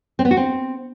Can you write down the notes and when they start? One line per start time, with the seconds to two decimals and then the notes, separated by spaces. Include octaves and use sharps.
0.19 C4
0.25 B3
0.31 F#4
0.37 C4